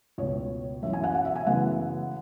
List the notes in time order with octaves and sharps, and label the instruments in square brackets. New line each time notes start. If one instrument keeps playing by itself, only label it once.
[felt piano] C#2 B2 B3 C#5
F#2 E3 C#4 E5
G#5
F#5
F#5
E5
G#5
F#2 C#3 E3 B3 F#5